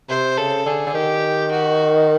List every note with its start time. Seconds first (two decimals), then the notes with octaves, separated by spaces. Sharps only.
0.09 C3 C5
0.38 C#3 A4
0.66 D3 G#4
0.87 D3
0.94 D#3 G4
1.52 F#4